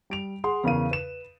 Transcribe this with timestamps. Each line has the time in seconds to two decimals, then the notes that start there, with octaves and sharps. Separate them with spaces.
0.10 G3 D7 F7
0.44 G#4 F#5 C6
0.64 E2 C#3 A#4 F5 D#7
0.91 B4 E7